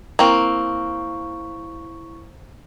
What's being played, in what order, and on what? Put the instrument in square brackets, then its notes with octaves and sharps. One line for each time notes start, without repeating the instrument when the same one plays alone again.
[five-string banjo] A#3 C4 [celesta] E4 C#6